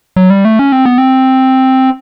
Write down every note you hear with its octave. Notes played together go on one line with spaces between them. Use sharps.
F#3
G3
A3
C#4
C4
B3
C4